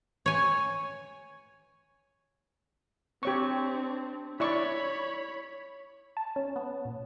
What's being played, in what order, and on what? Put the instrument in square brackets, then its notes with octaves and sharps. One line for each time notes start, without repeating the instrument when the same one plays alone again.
[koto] C#5 G#5
[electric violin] C4 D4 [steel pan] G4 C#5 C#6
[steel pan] E4 D5 C#6 [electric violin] C#5 B5
[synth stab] A5
C#4
B3
A#2